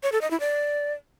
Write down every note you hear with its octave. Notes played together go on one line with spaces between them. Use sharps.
C#5
A4
D#5
E4
D5